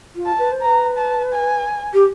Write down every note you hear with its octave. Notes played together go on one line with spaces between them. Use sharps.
F4
A5
B4
C5
B4 A#5
A5
G#5
G4